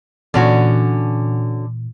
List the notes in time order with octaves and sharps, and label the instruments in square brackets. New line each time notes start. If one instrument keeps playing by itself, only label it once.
[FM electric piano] A#2 E3 [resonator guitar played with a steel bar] D3 C#4 F#4